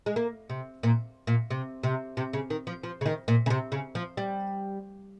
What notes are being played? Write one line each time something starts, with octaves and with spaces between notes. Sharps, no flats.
G#3
A#3
C3
A#2
A#2
C3
C3
C3
C#3
D#3
F3
F3
C#3
D#3
A#2
C#3
C3
C#3
F3
G3